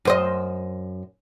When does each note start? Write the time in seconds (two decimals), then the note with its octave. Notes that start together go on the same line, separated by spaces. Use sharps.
0.05 F#2 C5 D#5